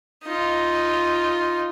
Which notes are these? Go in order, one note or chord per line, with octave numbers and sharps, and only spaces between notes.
D#4 F4